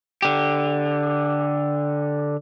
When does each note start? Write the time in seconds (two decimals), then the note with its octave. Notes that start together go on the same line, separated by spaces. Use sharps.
0.22 D3 G4